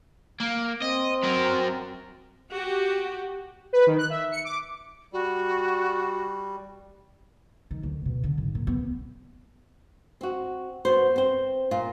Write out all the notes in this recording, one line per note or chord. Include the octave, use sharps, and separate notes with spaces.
A#3
C4 D#5
F#3 A#4
F#4 G4
B4
D#3
F#6
E5
C#7
D6
G3 F#4
D#3
D2
B2
D3
G#1
A#2
B3
C4 F#4
B3 F#4 C5
C4 C5
A#2 F4